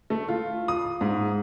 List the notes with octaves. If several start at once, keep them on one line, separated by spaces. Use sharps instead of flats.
A3
F4
D#6
G#2